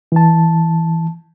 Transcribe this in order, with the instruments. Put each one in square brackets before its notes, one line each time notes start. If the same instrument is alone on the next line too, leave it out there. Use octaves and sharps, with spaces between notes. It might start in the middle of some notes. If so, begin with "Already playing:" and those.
[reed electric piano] E3 A5